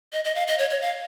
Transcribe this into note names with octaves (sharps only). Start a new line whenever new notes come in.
D#5
D#5
F5
D#5
C#5
C#5
F5